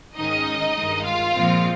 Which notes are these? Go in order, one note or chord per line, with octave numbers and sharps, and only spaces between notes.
G#2 D#3 G#3 C#4 D#4 D#5
G2 D#3 G#3
F4 F5
A#2 F3 G#3 C4